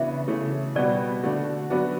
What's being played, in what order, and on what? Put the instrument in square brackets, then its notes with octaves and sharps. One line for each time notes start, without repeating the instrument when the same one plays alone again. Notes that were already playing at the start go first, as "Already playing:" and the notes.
Already playing: [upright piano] C#3 E3 B3 D4 F#4 [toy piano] E5
[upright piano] C#3 E3 A3
[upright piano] B2 G3 B3 F#4 [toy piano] D5
[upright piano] D3 A3 D4 F#4
F#3 B3 D4 F#4